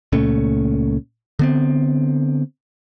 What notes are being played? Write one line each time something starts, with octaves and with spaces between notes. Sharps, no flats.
C#2 A#2 A3 C#4
D3 B3 C4